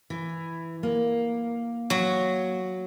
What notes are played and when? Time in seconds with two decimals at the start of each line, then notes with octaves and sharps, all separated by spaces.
0.10 E3
0.83 A#3
1.90 F#3